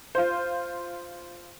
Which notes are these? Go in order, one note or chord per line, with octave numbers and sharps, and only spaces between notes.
F4 C5